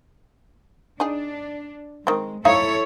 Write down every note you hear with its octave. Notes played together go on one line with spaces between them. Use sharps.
D4 D#4 G#4
D#3 G#3 C4
D#4 E4 A4 C#5 E5 F5